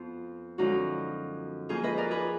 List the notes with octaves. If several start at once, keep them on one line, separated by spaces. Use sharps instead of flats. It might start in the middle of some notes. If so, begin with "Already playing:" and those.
Already playing: F2 F3 B3 F4
F#2 D3 F3 G#3 D#4 F#4
F2 F3 A#3 F4 G#4
B4 D#5
A#4 D5
G#4 B4